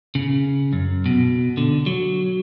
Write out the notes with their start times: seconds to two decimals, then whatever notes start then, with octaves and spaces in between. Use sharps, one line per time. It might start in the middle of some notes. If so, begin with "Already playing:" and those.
0.15 C#3
0.73 F#2
1.06 B2
1.57 D3
1.86 F#3